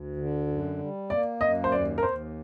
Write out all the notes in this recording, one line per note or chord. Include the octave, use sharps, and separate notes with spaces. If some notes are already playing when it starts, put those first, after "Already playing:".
Already playing: D2
D3
F#2
G3
A#3 D5
F#2 D#5
C5
D#2 D5
A#4
D#2 C5